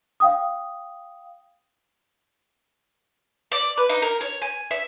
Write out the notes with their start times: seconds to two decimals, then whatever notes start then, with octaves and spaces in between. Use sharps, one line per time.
0.20 F5 G5 D#6
3.52 D5
3.78 B4
3.89 D#4
4.02 A#4
4.21 C#5
4.42 G#5
4.71 E5